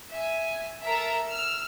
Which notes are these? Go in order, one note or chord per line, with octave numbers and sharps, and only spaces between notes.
E5 G#5
A4 A#4 E5 A#5
E6 F6